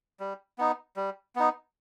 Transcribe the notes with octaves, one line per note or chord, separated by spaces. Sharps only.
G3
B3 D#4
G3
B3 D#4